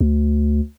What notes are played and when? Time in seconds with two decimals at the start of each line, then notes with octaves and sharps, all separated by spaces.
0.01 D2